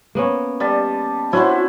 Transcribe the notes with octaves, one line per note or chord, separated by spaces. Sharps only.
A#3 B3 C#4
G3 D#5 A5
C#4 D4 E4 F#4 C5